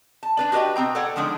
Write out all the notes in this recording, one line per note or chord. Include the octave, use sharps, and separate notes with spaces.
A5
D4 B4 D5
F#4 G4 B4 D#5 G5
B2 C4 G5 A#5
A4 C#5 D5 F#5
D3 F3 G#3 D4 D#4